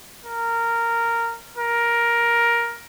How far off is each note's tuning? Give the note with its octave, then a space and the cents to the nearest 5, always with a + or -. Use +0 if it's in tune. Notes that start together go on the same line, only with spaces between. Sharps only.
A#4 -10
A#4 +10